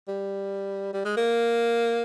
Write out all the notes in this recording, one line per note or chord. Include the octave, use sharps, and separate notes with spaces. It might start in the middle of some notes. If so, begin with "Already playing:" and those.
G3
G3
G#3
A#3